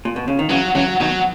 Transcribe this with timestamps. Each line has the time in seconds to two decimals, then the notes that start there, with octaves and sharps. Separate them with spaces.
0.05 A#2
0.16 B2
0.28 C#3
0.39 D#3
0.49 C#3 E3 F#3
0.75 C#3 E3 F#3
1.00 B2 D#3 F#3